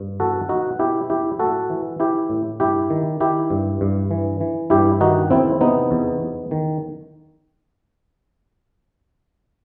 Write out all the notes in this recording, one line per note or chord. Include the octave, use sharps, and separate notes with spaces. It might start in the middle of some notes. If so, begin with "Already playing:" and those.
Already playing: G2
E2 F#4 A4
B2 D#4 F#4
B2 E4 G4
E2 E4 G4
A2 F#4 A4
E3
E3 E4 G4
A2
G2 E4 G4
D#3
D#3 E4 G4
G2
G2
E3
E3
G2 E4 G4
D#3 D#4 F#4
E2 C4 E4
C3 B3 D#4
E2
E2
D#3